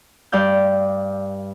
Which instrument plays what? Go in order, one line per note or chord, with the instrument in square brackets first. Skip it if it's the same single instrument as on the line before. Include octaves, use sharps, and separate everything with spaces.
[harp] G2 D5 F5 G6